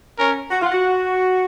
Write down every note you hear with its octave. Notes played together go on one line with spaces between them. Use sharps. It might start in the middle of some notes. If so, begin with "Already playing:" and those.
C#4 A#4
F#4
F4 F#5
F#4